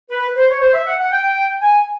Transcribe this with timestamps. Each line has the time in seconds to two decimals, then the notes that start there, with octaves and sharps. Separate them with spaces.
0.10 B4
0.36 C5
0.50 C#5
0.61 C5
0.73 E5
0.86 F#5
0.99 F#5
1.12 G5
1.61 G#5